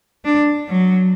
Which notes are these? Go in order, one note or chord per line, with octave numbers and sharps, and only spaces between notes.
D4
F#3